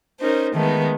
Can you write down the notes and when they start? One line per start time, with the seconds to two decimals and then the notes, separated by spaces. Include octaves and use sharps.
0.20 C#4 D#4 A#4 C5
0.55 D#3 G#3 A3 B3 D#4